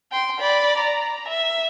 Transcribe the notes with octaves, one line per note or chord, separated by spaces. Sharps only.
G5 C6
D5 B5
A#5
E5